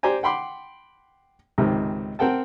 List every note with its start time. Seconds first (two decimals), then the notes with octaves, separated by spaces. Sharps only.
0.03 G4 C5 D5 G#5 A#5
0.23 F#5 G5 B5 C6 D6
1.58 C#2 G#2 C3 D#3
2.19 C4 A#4 F#5 G5 A5